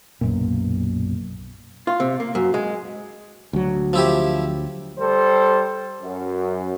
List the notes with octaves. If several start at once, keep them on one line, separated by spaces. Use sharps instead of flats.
B1 F#2 A#2
F4
C3
A#3
F#2
G#3
D2 F#3
F3 E4 G4
G3 A4 C5
F#2